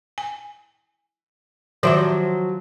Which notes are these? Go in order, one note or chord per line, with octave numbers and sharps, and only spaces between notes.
G#5
D#3 F3 F#3 C5 E5 D6